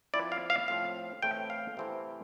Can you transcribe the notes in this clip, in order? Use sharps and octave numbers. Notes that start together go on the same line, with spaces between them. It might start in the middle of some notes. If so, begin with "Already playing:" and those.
F3 C4 E4 D5
F5
F5
A2 F3 C4 F5
A2 E3 A3 C4 G5
F5
C3 E3 A3 C4 E4